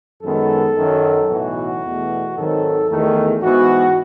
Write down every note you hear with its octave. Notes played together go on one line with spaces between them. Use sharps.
F#2 D#3 G#3 B3 A4
F#2 D#3 F#3
B1 A2 E3 F#4
E2 B2 A3
G#1 G#2 D#3 F#3 A4
E2 D#3 A3
G#2 E3 B3 F#4